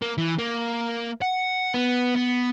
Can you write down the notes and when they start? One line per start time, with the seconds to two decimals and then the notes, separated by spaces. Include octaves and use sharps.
0.02 A#3
0.18 E3
0.39 A#3
1.22 F#5
1.74 B3
2.15 B3